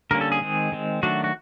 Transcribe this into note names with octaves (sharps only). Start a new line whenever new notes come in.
D3 G3 A#3 C#4 A#4
A4
G#4
D#3 G#3 C4
D#3 G#3 C4
D#3 F#3 A3 D4 F#4
F#4